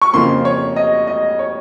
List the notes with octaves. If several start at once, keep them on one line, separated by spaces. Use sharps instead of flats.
C#6
F2 C#3 F3 A#3 C6
C#5
D#5
D#5
C#5